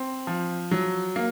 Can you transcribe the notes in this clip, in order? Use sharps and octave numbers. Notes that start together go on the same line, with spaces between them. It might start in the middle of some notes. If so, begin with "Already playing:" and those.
Already playing: C4
F3
F#3
A#3